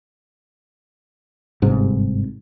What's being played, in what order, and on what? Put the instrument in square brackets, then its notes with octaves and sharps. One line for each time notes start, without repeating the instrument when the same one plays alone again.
[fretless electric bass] G1 G#2 C3